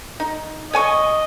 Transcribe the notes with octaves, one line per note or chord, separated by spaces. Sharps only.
D#4
C#5 D#5 G#5 C#6